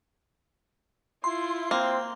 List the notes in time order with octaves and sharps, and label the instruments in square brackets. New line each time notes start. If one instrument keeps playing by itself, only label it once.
[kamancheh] E4 F4 [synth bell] C6
[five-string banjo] A#3 [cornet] C4